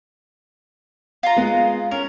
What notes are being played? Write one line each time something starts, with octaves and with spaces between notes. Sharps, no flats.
F4 A#5
G#3 B3
C#4 A#4